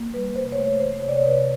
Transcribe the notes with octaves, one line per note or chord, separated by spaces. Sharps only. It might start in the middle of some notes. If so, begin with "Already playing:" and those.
Already playing: A#3
G3 B4
C3 C5
C#5
A3 C5
E3 C5
C3 C#5
D5
C#5
C3 B4
C5